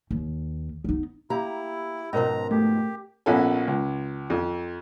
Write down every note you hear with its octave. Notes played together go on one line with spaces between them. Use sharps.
D#2
B3 D#4
A#3 E4 G4 A#5
G#2 B2 F3 C#4 A#4 C#5 A#5
A3 G4
A#1 B3 C#4 A4 G#5
C#2
F2